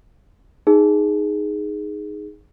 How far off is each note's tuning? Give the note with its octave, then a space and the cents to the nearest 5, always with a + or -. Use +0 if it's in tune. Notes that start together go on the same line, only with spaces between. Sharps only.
D#4 +0 G#4 +0